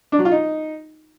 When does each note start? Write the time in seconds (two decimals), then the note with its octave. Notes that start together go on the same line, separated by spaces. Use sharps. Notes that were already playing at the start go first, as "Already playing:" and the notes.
0.12 D4
0.19 F#3
0.25 F4
0.32 D#4